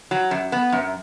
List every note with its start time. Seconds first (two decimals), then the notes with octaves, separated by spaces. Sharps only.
0.11 F#3
0.31 F#2
0.52 B3
0.72 F#2